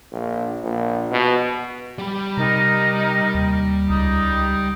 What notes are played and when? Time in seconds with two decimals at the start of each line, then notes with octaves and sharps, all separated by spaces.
0.12 A#1
0.64 A#1
1.11 B2
1.98 G3 B5
2.37 C3 D#4 A#4 A#5
3.34 D#2
3.90 C#2 D#4 A#5